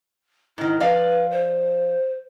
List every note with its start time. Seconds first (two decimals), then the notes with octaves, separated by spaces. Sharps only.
0.58 G#2 D#3 E4
0.80 F3 B4 D5 F5
1.31 C5